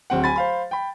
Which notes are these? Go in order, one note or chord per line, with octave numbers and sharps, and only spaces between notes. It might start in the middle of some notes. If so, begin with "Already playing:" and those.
D1 C4 F#5
G#5 B5 A6
C5 F5 B5
G5 B5